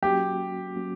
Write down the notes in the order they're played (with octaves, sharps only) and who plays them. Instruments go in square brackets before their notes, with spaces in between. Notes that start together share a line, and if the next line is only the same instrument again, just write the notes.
[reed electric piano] F#3 A#3 C#4 F#4 [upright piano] G4
[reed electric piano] F#3 A#3 C#4 F#4